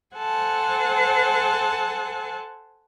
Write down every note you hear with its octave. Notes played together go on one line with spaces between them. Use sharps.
A4 C5 F#5 G#5 A5